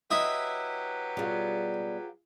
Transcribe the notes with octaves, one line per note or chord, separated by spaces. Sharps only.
F#3 E4 G4 B4 D#5 E5
B2 G3 F4 G#4 F5